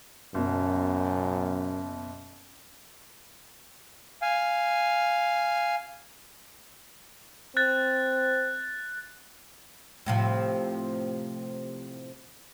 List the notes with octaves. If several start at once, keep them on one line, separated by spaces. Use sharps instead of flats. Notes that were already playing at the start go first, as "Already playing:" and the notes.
F#1 F#2 B2
F5 G#5
C4 F#6 A6
A2 C3 F3